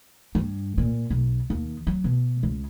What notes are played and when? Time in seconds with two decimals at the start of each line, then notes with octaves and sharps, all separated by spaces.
0.35 G2
0.78 A#2
1.10 B1
1.50 D#2
1.87 F#3
2.04 B2
2.43 C#2